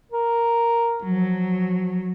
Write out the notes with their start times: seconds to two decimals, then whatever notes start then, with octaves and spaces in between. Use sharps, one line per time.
0.12 A#4
1.03 F3 F#3